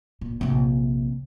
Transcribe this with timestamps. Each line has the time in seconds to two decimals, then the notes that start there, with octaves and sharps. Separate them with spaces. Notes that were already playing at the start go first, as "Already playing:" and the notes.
0.21 A#2
0.41 A#1 C3